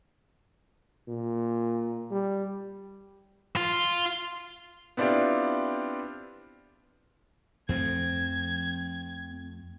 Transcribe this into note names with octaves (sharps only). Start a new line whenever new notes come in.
A#2
G3
F4
B3 C4 D4 E4 F4 G4
F2 F3 A3 C4 G#6